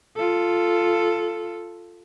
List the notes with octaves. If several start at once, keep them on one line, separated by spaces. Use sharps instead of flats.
F4 A4